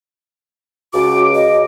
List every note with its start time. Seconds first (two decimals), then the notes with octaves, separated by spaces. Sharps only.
0.94 C#2 F#4 D6
1.35 D#5